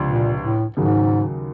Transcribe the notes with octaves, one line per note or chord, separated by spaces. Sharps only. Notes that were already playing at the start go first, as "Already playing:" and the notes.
Already playing: C#2 C3 F3 D4
A#2
A2
D#2 G#2 C#3 F#3